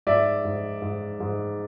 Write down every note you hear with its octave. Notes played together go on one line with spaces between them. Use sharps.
G#2 D5 E5
G#2
G#2
G#2